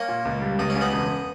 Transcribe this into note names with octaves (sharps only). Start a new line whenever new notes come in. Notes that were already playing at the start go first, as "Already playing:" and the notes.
Already playing: A#3 C#4
A#2
C#2
G3
C#2 D#4
C#4
C#3
B3 D#4
E1